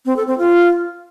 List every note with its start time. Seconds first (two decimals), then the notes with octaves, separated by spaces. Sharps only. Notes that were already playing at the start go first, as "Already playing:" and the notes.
0.06 C4
0.16 A4
0.27 C4
0.38 F4